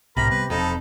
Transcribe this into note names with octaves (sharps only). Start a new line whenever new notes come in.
C2 A2 C3 A#4 B5 A#6
G3 G#3 B3 B4
E1 F2 C4 D#4 A4 B5